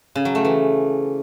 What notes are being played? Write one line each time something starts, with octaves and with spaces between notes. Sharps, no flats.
C#3
F#3
A3
E3